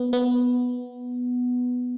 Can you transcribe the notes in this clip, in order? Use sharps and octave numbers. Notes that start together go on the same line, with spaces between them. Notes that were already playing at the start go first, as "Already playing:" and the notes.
Already playing: B3
B3